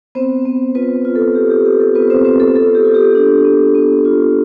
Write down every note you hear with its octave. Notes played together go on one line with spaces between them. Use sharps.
B3 C4 C5
B3
B3 F4 B4
F4
A4
B3 G4
G4
B3 G4
A4
B3 F4 B4
C4 C5
C4 F4 C5
A4
B3 A4
G4
F4
G4
D4
B3
B3
F4